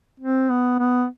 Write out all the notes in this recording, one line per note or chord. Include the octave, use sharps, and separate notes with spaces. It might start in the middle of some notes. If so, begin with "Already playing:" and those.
C4
B3
B3